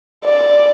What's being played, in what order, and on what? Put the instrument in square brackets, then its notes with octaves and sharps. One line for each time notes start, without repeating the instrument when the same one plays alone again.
[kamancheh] D5